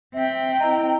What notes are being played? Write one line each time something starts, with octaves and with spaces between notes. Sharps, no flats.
C4 E5 G5
E4 D#5 A#5